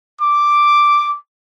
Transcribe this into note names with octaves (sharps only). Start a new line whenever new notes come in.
D6